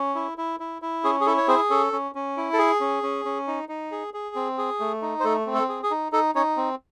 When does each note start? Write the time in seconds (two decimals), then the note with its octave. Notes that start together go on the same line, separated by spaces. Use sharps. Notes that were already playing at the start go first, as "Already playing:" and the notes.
Already playing: C#4
0.15 E4
0.38 E4
0.60 E4
0.82 E4
1.04 C#4 G#4
1.21 G#4
1.26 E4 A4
1.38 C#5
1.48 C4 G#4 C5
1.70 C#4 A4
1.92 C#4
2.15 C#4
2.37 E4
2.53 A4
2.58 G#4
2.80 C#4
3.03 C#4
3.25 C#4
3.47 D#4
3.69 D#4
3.92 G#4
4.14 G#4
4.35 C4
4.58 G#4
4.80 A3
5.02 D#4
5.20 C5
5.24 A3 A4
5.47 C4
5.54 A4
5.69 G#4
5.83 G#4
5.91 D#4
6.12 D#4 A4
6.35 C#4 D#4 C#5
6.57 C4